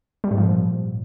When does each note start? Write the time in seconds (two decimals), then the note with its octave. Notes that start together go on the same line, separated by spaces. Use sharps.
0.24 G3
0.31 G#2
0.38 F3
0.45 A#2